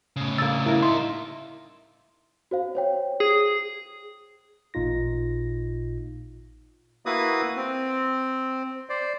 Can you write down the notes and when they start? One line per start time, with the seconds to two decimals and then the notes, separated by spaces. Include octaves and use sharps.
0.16 A2 C#3
0.38 A#3 D4 E6 A6
0.66 A#3 D4 E4 A#4
0.83 D#4 G#4 E5 C6
2.51 F#4 C5 F5
2.75 C5 C#5 G5
3.20 G#4
4.74 A1 A#2 D#4 F4 A#6
7.06 A#3 E4 F#4 B4 D#6
7.56 C4
8.89 C5 D5